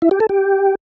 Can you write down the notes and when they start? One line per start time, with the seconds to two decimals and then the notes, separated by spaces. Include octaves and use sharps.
0.02 E4
0.11 G4
0.20 A4
0.29 G4